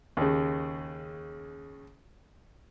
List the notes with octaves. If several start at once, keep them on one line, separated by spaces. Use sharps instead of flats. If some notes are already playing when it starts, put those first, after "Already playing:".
D#2 C#3